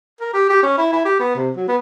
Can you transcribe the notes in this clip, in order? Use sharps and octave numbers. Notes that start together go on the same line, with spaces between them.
A#4
G4
G4
C#4
E4
E4
G4
B3
C3
F#3
B3